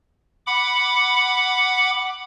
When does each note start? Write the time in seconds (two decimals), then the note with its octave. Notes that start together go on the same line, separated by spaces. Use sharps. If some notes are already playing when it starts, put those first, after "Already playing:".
0.47 F#5 B5 D6